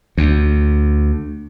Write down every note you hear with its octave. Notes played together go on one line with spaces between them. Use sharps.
D2